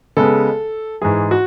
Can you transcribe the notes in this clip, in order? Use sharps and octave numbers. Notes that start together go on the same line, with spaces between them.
C#3 G#3 B3 A4
G#2 E3 G#3 G#4
F#4